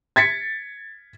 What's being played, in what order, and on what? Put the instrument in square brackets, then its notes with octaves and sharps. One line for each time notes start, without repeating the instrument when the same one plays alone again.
[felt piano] G#6 A6 B6 C#7